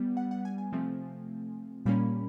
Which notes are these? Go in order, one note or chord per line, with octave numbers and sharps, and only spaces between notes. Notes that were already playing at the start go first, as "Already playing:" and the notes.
Already playing: G3 B3
F#5
F#5
G#5
G#5
C3 F3 A3 C4
A#2 G3 A#3 C#4 B5